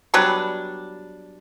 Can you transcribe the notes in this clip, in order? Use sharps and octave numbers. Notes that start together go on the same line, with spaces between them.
F#3 G3 B3 D4